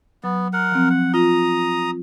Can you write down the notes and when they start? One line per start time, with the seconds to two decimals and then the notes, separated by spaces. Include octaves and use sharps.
0.24 F#3 B3
0.53 A#4 F#5
0.72 F3 C4
0.90 F#5
1.14 F4 A#5 D#6